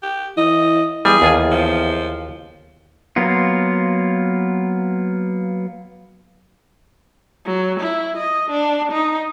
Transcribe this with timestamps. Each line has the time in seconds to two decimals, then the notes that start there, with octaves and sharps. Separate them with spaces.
0.02 G4
0.37 E3 D#5
1.05 E2 G3 G#4
1.22 D#2 F4 G#5
1.51 F3
3.16 F#3 A#3 B3 F4
7.45 F#3
7.80 E4
8.17 D#5
8.51 D4
8.92 D#4